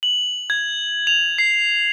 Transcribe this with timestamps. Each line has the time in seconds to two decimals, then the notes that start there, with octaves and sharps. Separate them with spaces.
0.03 F#7
0.50 G#6
1.07 F7
1.38 C7